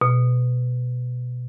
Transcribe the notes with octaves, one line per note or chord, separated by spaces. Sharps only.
B2